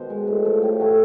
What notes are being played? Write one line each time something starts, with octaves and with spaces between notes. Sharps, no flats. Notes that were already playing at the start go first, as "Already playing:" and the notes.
Already playing: B2 D#3 C5
G#3
A2
F3 A3
A2 G4
F3 A3 F#4